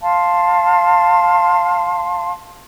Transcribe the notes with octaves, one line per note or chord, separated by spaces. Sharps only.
F5 A5 C6